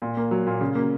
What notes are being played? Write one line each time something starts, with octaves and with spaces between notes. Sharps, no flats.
A#2
A#3
F#3
A#2
C#3
A#3